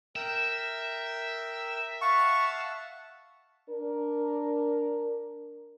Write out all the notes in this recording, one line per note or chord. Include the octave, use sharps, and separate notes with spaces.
A#4 E5 G5
F5 F#5 A5 C#6
D4 A#4